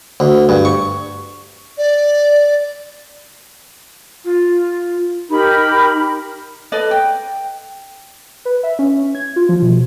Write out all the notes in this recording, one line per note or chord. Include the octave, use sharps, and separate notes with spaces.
D2
G2
C#6
D5
F4
D#4 G4 A#4 B5
A4 B4 D5 D#5
G5
B4
E5
C#4
G#6
F4
F3
B2